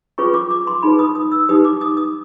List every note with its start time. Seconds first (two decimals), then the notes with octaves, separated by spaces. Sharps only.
0.18 C#4 F4 G#4 B4 C#6
0.34 D6
0.51 D6
0.67 C6
0.83 D#4 G#4 B4 B5
0.99 D#6
1.15 D#6
1.32 E6
1.49 D#4 G4 B4 D#6
1.64 D6
1.81 D#6
1.97 D#6